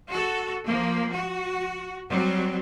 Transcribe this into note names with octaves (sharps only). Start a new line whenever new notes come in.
F#4 A4
F3 A#3
F#4
F#3 G3 C4